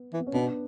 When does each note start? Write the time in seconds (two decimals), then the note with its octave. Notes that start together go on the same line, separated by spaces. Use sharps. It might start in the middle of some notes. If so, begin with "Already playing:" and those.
Already playing: B3
0.13 E3
0.20 B3
0.27 C#4
0.34 B2 B3 D4